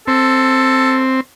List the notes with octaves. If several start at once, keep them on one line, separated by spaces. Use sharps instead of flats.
C4 A4